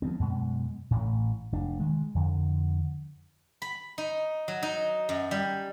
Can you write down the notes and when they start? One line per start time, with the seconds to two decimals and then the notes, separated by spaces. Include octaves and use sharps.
0.02 F3 G3 B3 C4
0.20 F#2 B2 G#3
0.91 A1 A2
1.52 F1 D4
1.79 D#3 G#3
2.15 F2 D3
3.62 B5
3.98 D#4
4.48 F#3
4.63 D#4
5.09 F#2
5.31 G3